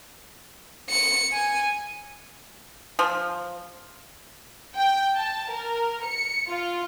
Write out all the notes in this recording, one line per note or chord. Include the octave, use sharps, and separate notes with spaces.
C#7
G#5
F3
G5
A5
A#4
C#7
F4